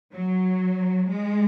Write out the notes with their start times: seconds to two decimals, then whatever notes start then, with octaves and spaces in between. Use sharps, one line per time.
0.13 F#3
1.09 G#3